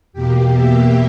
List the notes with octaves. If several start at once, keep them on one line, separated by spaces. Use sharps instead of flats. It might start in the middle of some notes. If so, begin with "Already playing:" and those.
E2 B2 A#3 G4
E5